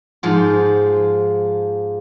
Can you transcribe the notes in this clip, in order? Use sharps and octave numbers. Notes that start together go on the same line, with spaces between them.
G#2 F3 F4